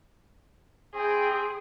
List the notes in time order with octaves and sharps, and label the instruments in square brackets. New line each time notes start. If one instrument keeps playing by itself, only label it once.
[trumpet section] C4 E4 G5 [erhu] G#4